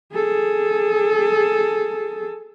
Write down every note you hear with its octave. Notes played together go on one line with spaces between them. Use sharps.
G#4 A4